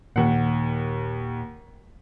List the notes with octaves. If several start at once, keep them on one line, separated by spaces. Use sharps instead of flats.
D#2 A#2 F#5